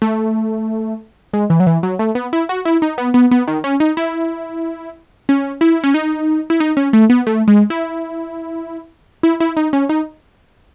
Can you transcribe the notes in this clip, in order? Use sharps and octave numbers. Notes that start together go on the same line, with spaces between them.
A3
G#3
E3
F#3
E3
F#3
A3
B3
E4
F#4
E4
D#4
B3
B3
B3
D#3
C#4
D#4
E4
C#4
E4
C#4
D#4
E4
D#4
C#4
A3
B3
A3
G#3
E4
E4
E4
D#4
C#4
D#4